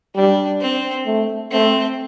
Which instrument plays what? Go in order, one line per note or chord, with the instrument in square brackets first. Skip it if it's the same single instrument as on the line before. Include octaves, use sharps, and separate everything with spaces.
[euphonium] G3 [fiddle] D4
[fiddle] C4
[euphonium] A3
[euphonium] A3 [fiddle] C4